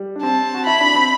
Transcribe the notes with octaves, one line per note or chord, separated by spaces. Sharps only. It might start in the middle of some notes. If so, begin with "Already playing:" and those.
Already playing: G3
D4
C4 A5
F#4
E4 B5
D4
C4